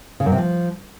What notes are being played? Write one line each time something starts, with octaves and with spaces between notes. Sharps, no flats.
C#3
F#2
C3
F3